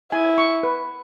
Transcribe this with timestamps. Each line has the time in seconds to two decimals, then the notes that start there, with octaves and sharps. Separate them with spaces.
0.12 E4 G#5
0.38 C#6
0.63 B4